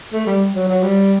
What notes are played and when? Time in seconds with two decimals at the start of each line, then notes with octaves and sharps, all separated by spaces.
0.13 A3
0.27 G3
0.55 F#3
0.69 F#3
0.84 G3